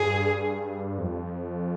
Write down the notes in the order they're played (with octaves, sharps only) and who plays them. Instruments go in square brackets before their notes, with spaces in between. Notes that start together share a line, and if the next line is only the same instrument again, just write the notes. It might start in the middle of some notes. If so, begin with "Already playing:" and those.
Already playing: [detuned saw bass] G2 [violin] G#4
[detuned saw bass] F2